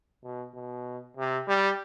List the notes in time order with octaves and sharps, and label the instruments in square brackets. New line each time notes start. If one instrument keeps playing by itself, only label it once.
[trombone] B2
B2
C3
G3